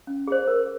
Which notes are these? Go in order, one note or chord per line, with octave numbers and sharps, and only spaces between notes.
C#4
G#4 C5
A#4